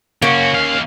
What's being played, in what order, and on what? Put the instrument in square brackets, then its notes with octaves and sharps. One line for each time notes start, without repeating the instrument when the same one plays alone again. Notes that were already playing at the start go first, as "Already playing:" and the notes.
[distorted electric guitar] C#3 F#4 [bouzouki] A#3 C#4
[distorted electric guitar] D#2 F5